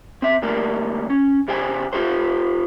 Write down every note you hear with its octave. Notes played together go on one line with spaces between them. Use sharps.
C4 E5
D3 G3 A3 A#3 A#4
C#4
C#3 G4 C5 G5 G#5
F4 G4 A4 C5